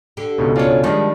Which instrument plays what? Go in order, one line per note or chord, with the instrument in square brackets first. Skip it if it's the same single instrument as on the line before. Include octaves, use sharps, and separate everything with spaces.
[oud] D3 G4
[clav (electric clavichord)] C#2 G#2 B2
[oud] D2 C#5 [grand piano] C#4 D4 F4
[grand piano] D#3 G3 D4 [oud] F3 G#3 D#4